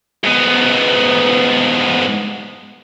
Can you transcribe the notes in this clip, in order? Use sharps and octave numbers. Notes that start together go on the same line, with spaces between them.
G#2 B3